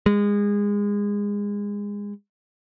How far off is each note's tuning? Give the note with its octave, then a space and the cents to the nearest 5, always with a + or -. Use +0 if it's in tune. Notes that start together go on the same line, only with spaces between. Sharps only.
G#3 -25